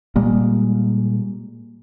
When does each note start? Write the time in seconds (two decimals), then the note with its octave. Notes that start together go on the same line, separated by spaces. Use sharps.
0.16 A#2 G3 G#3 A#3